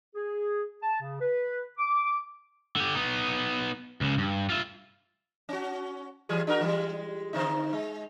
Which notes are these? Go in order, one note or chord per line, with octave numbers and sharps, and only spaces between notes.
G#4
A5
C#3
B4
D6
D3 G4
B3 D#4
C#2 C#3
G2
F4 E5
C#4 F#4
E3 G3 G#4
D4 F#4 A#4
E3 G3 G#3
D3 C4 D#4
G#3